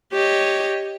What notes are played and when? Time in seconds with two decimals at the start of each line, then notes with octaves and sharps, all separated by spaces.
0.12 G4 C#5 D#5